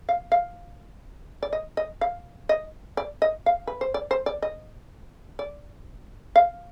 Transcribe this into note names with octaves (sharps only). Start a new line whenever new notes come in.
F5
F5
D5
D#5
D#5
F5
D#5
D5
D#5
F5
B4
C5
D5
C5
D5
D#5
D5
F5